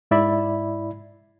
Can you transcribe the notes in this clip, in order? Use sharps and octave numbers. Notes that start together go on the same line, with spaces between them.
G#2 E4 D5 E5 B5